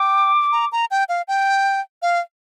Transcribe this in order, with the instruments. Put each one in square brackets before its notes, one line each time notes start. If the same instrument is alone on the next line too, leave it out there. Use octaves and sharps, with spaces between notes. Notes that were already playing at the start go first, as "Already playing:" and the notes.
Already playing: [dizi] G5 [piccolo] D6
[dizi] A#5
A#5
G5
F5
G5
F5